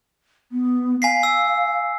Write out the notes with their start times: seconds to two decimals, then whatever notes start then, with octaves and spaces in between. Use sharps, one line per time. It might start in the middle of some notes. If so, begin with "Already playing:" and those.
0.51 B3
1.02 F5 G#5 B6 C7
1.23 E6